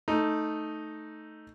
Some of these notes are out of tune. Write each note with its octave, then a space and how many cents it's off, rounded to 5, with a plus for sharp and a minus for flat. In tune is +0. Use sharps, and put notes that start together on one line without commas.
A3 +0 D#4 +0